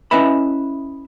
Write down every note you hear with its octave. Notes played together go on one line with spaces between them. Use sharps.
C#4 E4 B4 D#5 E5 B5